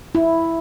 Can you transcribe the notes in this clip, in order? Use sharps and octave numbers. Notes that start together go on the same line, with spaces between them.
E4